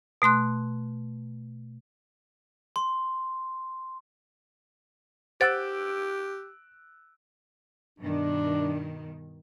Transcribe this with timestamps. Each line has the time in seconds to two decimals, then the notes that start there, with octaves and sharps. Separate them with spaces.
0.22 B2 A3 C6 F#6
2.76 C6
5.41 G4 C5 F#5 E6 F#6 A6 D7
7.99 G2 B2 D#3 D4